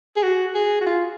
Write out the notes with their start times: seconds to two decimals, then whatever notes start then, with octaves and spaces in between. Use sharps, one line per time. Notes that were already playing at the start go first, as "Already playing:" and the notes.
0.16 G#4
0.23 F#4
0.55 G#4
0.81 F#4
0.87 F4